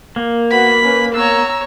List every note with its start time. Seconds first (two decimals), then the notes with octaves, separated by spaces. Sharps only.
0.16 A#3
0.51 B3 F#4 B5
0.84 C#4 B4
1.14 B3 C#5 A#5 E6